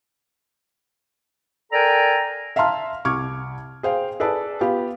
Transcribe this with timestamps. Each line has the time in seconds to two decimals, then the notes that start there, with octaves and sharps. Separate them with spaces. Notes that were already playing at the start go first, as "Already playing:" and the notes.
1.73 A4 A#4 D5 G5 G#5 A#5
2.56 E5 F5 A5 A#5 C6 F6
3.05 C2 C#6 D6 F6 G#6
3.83 G#4 C5 F5 G5
4.20 G#4 A4 B4 D5 A5
4.61 B3 F4 G4 F5